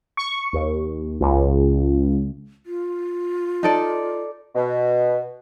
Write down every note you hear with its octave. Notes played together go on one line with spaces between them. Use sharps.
C#6
D#2
C#2
F4
D#4 A4 D5
B2